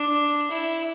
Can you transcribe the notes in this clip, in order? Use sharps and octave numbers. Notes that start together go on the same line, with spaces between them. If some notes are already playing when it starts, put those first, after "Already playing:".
Already playing: D4
E4